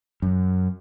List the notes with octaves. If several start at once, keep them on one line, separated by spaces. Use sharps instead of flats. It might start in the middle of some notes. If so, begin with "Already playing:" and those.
F#2